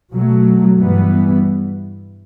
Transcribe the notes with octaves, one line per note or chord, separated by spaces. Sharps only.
B2 F#3 A3
G2 E3 G3 B3